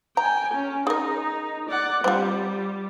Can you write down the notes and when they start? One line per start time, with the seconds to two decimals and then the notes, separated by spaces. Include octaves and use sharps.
0.17 G5 G#5 A#5
0.54 C#4
0.87 D#4 G#4 A#4
1.69 D5 F#5
2.04 G3 C4 F4